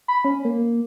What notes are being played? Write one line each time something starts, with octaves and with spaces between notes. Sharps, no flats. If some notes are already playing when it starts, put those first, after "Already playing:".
B5
C#4
A#3